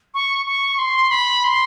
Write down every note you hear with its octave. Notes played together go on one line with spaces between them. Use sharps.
C#6
C#6
C6
B5
C6